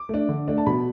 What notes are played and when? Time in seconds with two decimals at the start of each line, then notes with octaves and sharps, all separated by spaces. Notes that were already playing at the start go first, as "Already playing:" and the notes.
Already playing: D6
0.09 A3 D4
0.29 D3
0.48 A3 D4
0.58 A5
0.66 B2 B5